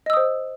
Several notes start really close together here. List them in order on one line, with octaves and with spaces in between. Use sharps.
D#5 E6 D#6 C5